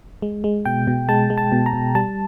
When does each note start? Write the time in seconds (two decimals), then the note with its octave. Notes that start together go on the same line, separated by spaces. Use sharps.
0.22 G#3
0.44 G#3
0.65 B2 G5
0.87 B2
1.09 G#3 A5
1.30 G#3
1.38 A5
1.52 B2
1.66 A#5
1.73 B2
1.95 G3 A5